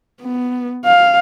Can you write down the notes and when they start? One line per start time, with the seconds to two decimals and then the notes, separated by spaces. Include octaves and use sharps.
0.22 B3
0.85 F5